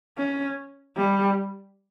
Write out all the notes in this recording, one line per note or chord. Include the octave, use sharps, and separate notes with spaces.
C#4
G3